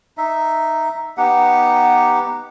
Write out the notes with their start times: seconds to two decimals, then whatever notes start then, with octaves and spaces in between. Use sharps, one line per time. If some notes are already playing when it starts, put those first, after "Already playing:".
0.18 D#4 E5
1.17 B3 D#4 G4 F#5